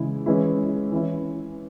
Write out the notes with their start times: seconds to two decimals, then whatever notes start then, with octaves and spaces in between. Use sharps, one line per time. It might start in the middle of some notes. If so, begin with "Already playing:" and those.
Already playing: C#3 E3 G#3 E4
0.26 E3 G#3 C#4 E4
0.92 E3 C#4 E4